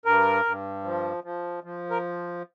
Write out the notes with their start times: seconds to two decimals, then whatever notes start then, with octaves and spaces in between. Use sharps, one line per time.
0.05 G2 A#4
0.45 G2
0.84 F3
1.24 F3
1.64 F3
1.90 A#4